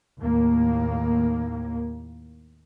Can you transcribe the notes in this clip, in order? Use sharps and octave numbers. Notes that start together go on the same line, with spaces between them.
D#2 A2 A#3